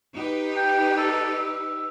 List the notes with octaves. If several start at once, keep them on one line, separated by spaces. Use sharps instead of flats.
D#4 G4 B4
G5
A4
E6